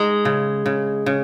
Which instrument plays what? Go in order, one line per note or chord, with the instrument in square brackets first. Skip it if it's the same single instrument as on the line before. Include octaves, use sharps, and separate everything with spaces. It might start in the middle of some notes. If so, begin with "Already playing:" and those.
Already playing: [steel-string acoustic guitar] G#3 [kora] D#4
[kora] C#3
C#3
C#3